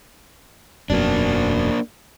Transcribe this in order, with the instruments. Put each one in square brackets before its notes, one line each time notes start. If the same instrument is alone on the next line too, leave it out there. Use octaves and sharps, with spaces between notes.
[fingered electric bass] E1 F#2 B2 [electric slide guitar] A#3 D4